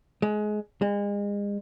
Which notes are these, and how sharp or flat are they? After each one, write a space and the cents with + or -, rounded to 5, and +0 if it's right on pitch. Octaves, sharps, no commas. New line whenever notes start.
G#3 +25
G#3 -35